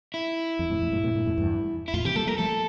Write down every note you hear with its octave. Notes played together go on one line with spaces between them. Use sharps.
E4
F2
F2 A2
F2 A2
G2 A#2
A2 C3
G2 A#2
F2 A2
E2 G2
E4
F2 A2 F4
C3 E3 G4
G3 A#3 A4
G3 A#3 A#4
F3 A3 A4